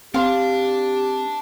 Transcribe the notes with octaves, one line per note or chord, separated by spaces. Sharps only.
C4 D4 G4 F5 C6